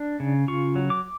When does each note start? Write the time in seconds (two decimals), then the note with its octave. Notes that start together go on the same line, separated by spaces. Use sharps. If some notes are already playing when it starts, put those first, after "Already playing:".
Already playing: D4
0.20 C#3
0.48 F4 C#6
0.76 F#3
0.90 D6